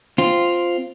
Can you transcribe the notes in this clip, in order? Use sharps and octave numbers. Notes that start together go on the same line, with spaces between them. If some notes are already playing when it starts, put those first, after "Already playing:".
C4 F4